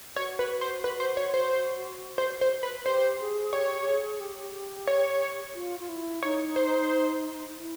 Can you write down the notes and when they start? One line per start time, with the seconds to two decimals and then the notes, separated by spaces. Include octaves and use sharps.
0.16 F#4 C#5
0.39 B4
0.61 C5
0.84 B4
1.00 C5
1.17 C#5
1.34 C5
2.18 C5
2.41 C5
2.63 B4
2.86 G4 C5
3.20 G#4
3.53 G4 C#5
3.81 G4
3.87 G#4
4.20 G4
4.87 C#5
5.55 F4
5.80 F4
5.89 E4
6.23 D#4 C#5
6.56 C5
7.58 E4